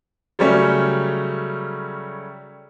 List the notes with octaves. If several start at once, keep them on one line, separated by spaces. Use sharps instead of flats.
C#3 F#3 G3 A3 C#4